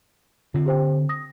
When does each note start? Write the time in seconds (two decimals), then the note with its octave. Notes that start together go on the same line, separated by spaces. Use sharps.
0.54 D3 C4 F4
0.66 G4 C5 G5
1.09 D#6 A#6